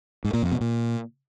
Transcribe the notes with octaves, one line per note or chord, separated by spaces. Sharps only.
G#2
A#2
F2
B2
A#2